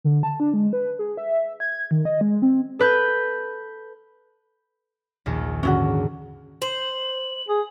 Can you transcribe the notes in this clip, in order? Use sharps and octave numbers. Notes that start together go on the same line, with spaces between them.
D3
A5
D4
G#3
B4
G#4
E5
G#6
D#3
D#5
G#3
C4
A4 B4 G6
A#1 D#2 A#3
D#2 G#2 D3 C#4 E4 F#4
C5 F#7
G#4 D#6